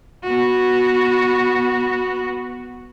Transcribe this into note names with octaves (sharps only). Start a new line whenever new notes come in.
B3 F#4